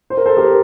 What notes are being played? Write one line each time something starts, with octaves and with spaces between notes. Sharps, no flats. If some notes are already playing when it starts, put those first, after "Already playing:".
C5
A#4
A4 C5
G4 A#4